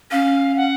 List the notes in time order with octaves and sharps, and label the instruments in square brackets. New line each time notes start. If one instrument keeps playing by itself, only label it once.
[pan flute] C#4 [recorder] F5
[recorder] F#5